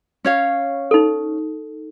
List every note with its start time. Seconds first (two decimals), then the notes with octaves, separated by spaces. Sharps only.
0.25 C#4 C#5 F5
0.91 D#4 A4